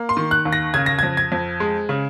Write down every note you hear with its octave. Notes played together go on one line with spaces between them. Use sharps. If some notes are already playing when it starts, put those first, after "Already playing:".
Already playing: A#3
C6
D#3
F#6
D#2
A#6
C#3 G#6
A#6
F2 G#6
G#6
F2
G#3
C#3